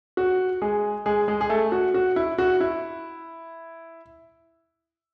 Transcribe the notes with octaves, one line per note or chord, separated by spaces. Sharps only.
F#4
G#3 G#4
G#3 G#4
G#3 G#4
G#4
A3 A4
F#4
F#4
E4
F#4
E4